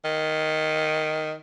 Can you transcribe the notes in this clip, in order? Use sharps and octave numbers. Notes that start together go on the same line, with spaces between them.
D#3